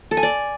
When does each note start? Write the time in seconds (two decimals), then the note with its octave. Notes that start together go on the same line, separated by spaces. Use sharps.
0.11 A4
0.17 G#5
0.23 D5